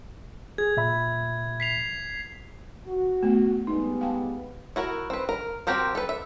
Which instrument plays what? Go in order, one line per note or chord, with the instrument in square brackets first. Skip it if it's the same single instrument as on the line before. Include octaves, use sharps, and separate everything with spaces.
[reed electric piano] G#4 [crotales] G#6
[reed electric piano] A#2 E5 B5
[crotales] B6 C7 F7
[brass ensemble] F#4
[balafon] A3 B3
[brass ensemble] G3 G#3 B3 [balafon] D#4
[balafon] F5 G5 A5
[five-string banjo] E4 F#4 A#4
C4 B4
A#4
C4 F#4 G4 A#4 C5
A4 B4
E5